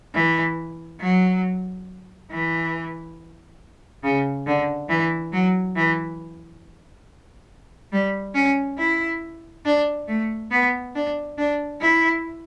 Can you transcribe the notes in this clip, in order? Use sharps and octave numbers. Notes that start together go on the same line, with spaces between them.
E3
F#3
E3
C#3
D3
E3
F#3
E3
G3
C#4
E4
D4
A3
B3
D4
D4
E4